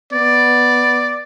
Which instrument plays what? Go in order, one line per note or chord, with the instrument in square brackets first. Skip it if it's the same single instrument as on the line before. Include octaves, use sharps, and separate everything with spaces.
[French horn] B3 [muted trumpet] D5